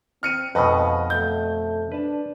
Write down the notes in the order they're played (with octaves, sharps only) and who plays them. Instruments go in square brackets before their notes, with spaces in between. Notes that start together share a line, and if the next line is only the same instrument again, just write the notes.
[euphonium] C4 [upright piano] F6 C#7 D#7
[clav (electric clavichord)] F2 B2 [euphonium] G#2 [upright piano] B4 D#5
[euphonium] A3 [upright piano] G6
[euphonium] D4 [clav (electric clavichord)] B4 A5